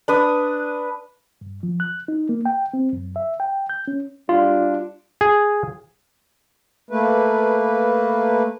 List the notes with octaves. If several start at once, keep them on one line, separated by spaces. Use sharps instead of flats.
D4 B4 D#6
G2
F3
F#6
D#4
A#3
G5
C4
F#2
E5
G5
G6
C#4
G3 D4 F4
G#4
A3 A#3 B4